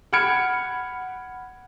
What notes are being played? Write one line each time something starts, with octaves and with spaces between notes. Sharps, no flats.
F#5 B5 F6 G#6 C#7 D7